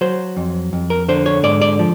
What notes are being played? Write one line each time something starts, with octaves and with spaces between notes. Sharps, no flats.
F#3 C5
F2
F2
A#4
D3 C5
C#5
G#2 D5
D5
F3